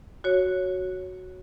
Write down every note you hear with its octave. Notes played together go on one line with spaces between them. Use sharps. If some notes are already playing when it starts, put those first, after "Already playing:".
F#4 C#5